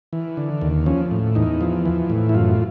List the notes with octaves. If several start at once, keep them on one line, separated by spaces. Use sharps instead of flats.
E3
D3
D#2
F3 C#4
A2
E2 D#4
F3
E3
A2
E4
F#2 F4